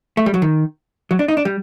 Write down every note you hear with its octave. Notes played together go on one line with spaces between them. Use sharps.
A3
G3
F#3
D#3
F#3
D4
D#4
D4
G3